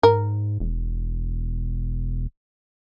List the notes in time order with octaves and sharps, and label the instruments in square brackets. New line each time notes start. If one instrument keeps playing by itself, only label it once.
[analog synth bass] G#2 [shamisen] A#4
[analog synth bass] E1